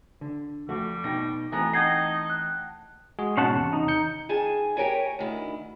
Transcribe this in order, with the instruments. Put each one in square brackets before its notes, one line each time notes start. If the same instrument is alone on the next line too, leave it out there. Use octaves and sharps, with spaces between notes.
[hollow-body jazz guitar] D3
[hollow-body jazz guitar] F2 A3 F#4 [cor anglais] G3
[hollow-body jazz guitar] B2 D#4 G5 [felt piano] A#6
[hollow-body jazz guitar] E3 A3 C4 [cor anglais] B3 [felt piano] G#5 A#5 A#6
[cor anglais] D#4 [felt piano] F#5 G5 A5 [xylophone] G#6 A#6 C7
[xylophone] F#6
[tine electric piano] G#3 F#4 G#4
[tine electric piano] G#2 B2 [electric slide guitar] C#4 F#5 A5
[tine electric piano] E2 C3
[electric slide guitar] D#4
[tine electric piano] D#3 G6 C#7
[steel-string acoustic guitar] D#3 G#4 G#5 A5
G4 A#4 C#5 G#5
D2 D#3 E4